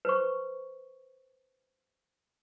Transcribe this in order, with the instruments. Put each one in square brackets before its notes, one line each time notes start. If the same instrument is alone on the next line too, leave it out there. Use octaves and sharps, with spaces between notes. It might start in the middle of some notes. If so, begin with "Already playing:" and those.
[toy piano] B4 C5 C#6